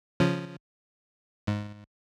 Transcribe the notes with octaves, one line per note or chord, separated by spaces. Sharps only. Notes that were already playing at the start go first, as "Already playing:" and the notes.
C#3 F3 C#4
G#2